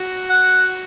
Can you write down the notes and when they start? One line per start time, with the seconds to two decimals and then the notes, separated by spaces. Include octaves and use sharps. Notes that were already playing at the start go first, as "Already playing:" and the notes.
Already playing: F#4
0.30 F#5